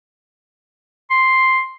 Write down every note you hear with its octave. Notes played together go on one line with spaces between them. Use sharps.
C6